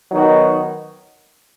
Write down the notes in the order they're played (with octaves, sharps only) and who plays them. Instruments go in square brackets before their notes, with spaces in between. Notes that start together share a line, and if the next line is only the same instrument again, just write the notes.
[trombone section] D#3 F#3 B3 D#4 F#4